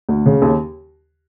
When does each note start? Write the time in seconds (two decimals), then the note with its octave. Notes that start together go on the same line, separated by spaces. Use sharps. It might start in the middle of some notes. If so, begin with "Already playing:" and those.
0.09 D2
0.26 C#3
0.42 D#2